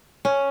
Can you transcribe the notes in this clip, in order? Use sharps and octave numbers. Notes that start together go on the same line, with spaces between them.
C#4